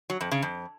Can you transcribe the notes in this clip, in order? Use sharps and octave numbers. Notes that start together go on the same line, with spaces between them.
F#3
F2
C#3
F2